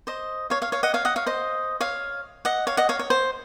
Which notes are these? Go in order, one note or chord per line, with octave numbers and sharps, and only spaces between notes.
C5 D#5
C#5 F5
C#5 F5
C#5 F5
D#5 F#5
C#5 F5
D#5 F#5
C#5 F5
C5 D#5
C#5 F5
D#5 F#5
C#5 F5
D#5 F#5
C#5 F5
C#5
C5